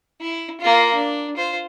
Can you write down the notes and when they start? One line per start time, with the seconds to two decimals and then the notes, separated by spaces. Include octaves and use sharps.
0.21 E4
0.60 A#3 F4
0.94 D4
1.37 F4 C5